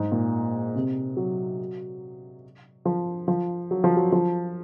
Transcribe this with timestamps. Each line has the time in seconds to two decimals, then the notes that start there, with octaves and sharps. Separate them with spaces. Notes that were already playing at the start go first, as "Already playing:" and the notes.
Already playing: G#2
0.12 A#2
0.76 C3
1.17 F#3
2.85 F3
3.28 F3
3.71 F#3
3.84 F3
3.96 F#3
4.12 F3